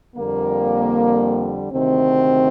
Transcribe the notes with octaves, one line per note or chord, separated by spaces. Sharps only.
F2 D3 G3 A#3
D2 C3 D#3 C4